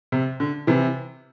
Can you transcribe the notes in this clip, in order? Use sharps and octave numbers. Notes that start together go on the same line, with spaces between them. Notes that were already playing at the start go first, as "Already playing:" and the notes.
C3
D3
C3 E3